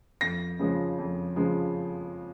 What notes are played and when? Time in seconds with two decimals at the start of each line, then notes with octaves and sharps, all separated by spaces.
0.21 F2 A#6
0.59 C#3 F3 G#3
0.98 F2
1.36 C#3 F3 G#3